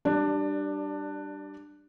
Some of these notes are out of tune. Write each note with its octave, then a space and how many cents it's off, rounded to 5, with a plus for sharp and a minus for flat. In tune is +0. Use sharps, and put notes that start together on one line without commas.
G3 -10 D4 +15 D5 -10